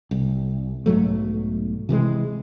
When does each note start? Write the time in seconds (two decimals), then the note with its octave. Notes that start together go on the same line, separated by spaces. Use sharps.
0.11 C2
0.86 B1 G#2 F#3 A3
1.89 C3 E3 F3 G#3